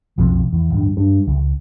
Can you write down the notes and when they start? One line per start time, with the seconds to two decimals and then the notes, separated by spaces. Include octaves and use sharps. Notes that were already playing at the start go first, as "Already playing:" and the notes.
0.18 B1 F2 C3 F3
0.52 E2
0.70 D1 G2
0.97 G2
1.27 C#2